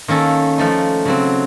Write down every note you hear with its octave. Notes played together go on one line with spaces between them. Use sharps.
D#3 A#3 C#4 A4
F3 A3 D#4
C#3 F#3 C4